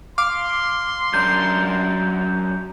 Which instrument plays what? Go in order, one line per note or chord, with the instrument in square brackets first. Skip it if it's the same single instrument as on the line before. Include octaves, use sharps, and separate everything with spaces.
[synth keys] F5 [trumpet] C6 [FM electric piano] D6
[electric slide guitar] F#2 D4 A#4 [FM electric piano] G6